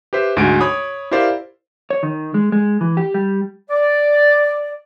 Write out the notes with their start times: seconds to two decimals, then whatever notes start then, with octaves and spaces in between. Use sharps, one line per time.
0.13 G4 B4 C5 E5
0.37 D2 G#2 F#4 G#5 D7
0.61 C#5 B5 D#6
1.11 E4 G4 A#4 C5 D5 F5
1.90 C#5
2.03 D#3
2.34 G#3
2.52 G#3
2.81 E3
2.97 G4
3.14 G3
3.69 D5